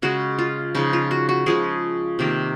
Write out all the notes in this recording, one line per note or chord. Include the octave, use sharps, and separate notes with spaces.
C#3 G#3 F#4
F4
C#3 F3 G#3 D#4
F4
F#4
F#4
C#3 F3 G#3 G#4
C3 D#3 A#3